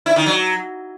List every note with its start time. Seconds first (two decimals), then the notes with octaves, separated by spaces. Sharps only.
0.06 E4
0.16 D#3
0.26 F#3